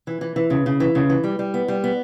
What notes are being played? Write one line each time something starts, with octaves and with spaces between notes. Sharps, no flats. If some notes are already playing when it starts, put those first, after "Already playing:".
E3
E3
E3
C#3
C#3
E3
C#3
E3
G3
G3
B3
G3
B3